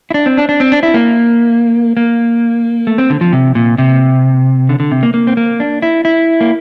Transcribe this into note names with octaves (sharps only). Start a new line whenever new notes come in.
E4
D4
C4
D4
D4
C4
D4
E4
A#3
A#3
A3
C4
D3
F3
C3
A#2
C3
D3
D3
C3
A#3
A#3
C4
A#3
D4
E4
E4
A#3